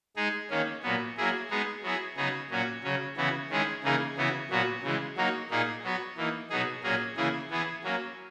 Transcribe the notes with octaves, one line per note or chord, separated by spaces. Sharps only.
G#3 D#4 G#4
D#3 A#3 C#4
A#2 F#3 B3
F#3 A#3 E4 G#4
G#3 B3 D#4 G#4
F#3 B3 E4 G#4
C#3 F#3 B3 D#4 G#4
A#2 F#3 C#4 F#4
C#3 F#3 C#4
C#3 E3 B3 F#4
D#3 G#3 C#4 E4 G#4
C#3 E3 A#3 D#4 G#4
C#3 E3 B3 F#4
A#2 F#3 B3 F#4
C#3 E3 G#3
F#3 A#3 D#4 F#4
A#2 A#3 D#4 G#4
F#3 B3 F#4
E3 A#3 D#4
B2 F#3 B3 D#4 G#4
A#2 F#3 A#3 C#4 G#4
C#3 E3 A#3 E4 G#4
E3 B3 E4 G#4
F#3 A#3 C#4